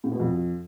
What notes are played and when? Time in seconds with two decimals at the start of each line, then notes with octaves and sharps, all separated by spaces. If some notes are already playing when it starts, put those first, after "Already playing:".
0.04 A2
0.12 B2
0.20 F2